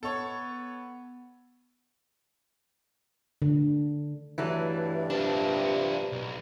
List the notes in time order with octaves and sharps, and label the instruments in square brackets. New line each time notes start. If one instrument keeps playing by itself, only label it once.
[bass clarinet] B3 [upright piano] A4 C#5
[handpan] D3
[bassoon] G2 [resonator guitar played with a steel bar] E3 F#3 A3
[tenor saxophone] C3 [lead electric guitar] D4 F4 [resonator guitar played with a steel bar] A5
[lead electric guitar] B1